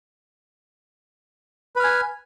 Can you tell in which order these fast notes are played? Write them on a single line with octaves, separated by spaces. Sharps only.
B4 F6 G#5